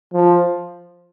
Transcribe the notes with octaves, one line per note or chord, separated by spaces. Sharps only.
F3